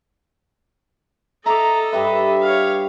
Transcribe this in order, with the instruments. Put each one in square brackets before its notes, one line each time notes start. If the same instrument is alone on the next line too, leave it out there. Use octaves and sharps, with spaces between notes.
[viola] A4 D#5 [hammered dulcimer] E5 D6 [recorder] A#5
[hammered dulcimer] G2 G4 B4 [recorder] E5
[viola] C#5 F5